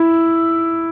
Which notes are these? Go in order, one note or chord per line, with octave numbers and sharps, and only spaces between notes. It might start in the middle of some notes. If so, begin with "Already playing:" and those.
Already playing: E4